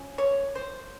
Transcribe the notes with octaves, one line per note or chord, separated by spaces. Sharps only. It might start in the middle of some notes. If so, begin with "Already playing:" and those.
Already playing: F3 C#4
C#5
C5